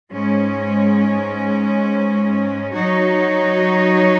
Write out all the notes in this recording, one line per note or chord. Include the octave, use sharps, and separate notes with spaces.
G#2 G#3 C#4
F#3 D#4 F#4 C#5